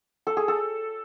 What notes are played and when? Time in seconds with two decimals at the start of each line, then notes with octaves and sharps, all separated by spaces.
0.27 A4
0.37 G#4
0.48 A4